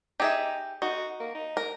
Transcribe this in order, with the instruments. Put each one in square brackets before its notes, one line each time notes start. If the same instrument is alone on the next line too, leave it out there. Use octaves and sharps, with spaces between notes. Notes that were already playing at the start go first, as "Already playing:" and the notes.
[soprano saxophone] D#4 [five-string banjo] G4 G#4 E5
[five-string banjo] D#4 [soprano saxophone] F#4
[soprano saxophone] A#3
D#4
[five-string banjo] A#4